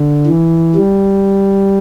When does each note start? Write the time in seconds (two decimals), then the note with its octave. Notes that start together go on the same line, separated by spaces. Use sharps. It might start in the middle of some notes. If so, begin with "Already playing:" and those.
Already playing: D3
0.27 E3
0.75 G3